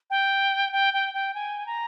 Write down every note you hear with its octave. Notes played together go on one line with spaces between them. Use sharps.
G5
G5
G5
G5
G#5
A#5